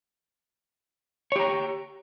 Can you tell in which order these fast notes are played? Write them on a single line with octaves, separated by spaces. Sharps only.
C#5 G4 A#5